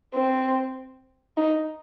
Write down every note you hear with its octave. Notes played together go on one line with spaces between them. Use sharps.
C4
D#4